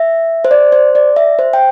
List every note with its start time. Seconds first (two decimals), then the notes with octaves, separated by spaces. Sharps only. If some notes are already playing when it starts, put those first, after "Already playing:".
Already playing: E5
0.45 C5
0.51 D5
0.72 C5
0.95 D5
1.16 E5
1.39 C5
1.53 G5